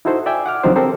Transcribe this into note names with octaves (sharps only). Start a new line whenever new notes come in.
D#4 E4 F#4 A4 C5
D5 E5 G5 G#5
F#5 D6 F6
D3 F3 F#3 C4 D#4 C5
C4 G4 A4 A#4 C5